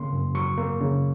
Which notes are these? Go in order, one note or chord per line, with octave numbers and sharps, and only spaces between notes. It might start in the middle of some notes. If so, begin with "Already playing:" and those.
Already playing: C#3 A#3 C6
F#2
F#3 C#6
A#3
C#3